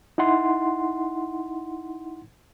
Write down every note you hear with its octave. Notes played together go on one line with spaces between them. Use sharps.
D#4 E4 F#5 C6